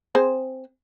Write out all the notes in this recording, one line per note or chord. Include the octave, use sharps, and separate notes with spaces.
C4 G#4 C5